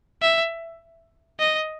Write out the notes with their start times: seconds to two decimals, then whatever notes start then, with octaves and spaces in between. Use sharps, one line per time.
0.22 E5
1.40 D#5